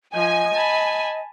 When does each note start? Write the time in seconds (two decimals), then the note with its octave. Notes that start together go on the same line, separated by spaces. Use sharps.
0.14 F3 D#5 G#5
0.54 A5 B5